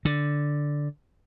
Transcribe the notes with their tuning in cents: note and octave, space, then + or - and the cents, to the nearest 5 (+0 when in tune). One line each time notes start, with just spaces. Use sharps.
D3 +0